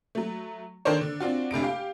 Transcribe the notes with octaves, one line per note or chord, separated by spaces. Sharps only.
F#3 A3
D#3 D4 A4 A#4 C5 C#5
D3
C4 D4 F4 F#4
F1 D2 C3 D7
G4 F5